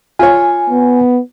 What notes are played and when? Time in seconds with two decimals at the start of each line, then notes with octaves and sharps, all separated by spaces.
0.19 F4 C#5 G#5
0.70 B3